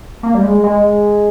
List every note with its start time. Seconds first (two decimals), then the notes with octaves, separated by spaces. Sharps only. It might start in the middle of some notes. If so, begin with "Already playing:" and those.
0.23 A#3
0.35 G3
0.44 G#3
0.64 G#3